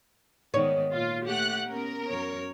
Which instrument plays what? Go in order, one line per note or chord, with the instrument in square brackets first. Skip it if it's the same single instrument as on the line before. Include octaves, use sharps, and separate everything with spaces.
[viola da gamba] G#2 D#3 B3 [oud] C#5
[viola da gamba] A#2 [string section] F4
[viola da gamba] A3 [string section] G4 F#5 F#6
[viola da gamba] B3 C#4 [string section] A#4
[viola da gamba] F#2 C#5